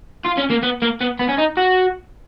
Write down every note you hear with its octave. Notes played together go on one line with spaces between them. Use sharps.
F4
C#4
A#3
B3
A#3
B3
B3
C#4
D#4
F#4